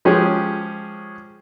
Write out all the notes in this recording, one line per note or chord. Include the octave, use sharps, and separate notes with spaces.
F3 G#3 C#4 G4 G#4